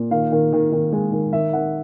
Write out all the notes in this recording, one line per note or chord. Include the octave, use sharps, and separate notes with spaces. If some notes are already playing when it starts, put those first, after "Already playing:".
Already playing: A#2
D#3 F5
D#3
D#3
D#3
G#3
D#3
D#3 E5
D#3 F#5